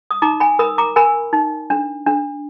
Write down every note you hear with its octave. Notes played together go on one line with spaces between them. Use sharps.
D#6
D#4 A#5 D6
G#5 B5
A#4 B5 D#6
A#5 D6
A#4 G#5 B5
D#4
D4
D4